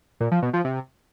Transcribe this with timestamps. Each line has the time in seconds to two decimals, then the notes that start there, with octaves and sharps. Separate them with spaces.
0.20 A#2
0.31 F3
0.42 B2
0.53 F3
0.64 C3